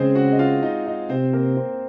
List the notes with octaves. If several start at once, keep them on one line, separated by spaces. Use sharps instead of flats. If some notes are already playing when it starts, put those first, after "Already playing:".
Already playing: C#3 G#3 C4 G#4 C5
F#4 F#5
D#5
F4 F5
D#4 D#5
D#4 D#5
C3 C4 C5
A#3 A#4
C4 C5